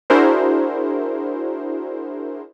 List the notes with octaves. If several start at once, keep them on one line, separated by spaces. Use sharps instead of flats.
D4 E4 F#4 G#4 A#4 C5